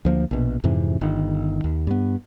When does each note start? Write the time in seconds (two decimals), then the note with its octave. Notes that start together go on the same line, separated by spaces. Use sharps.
0.05 D2 F3 A#3
0.31 A#1 B2
0.64 F2 G#2 C3 E3
1.01 G1 D#3
1.64 D#2
1.87 G2 B3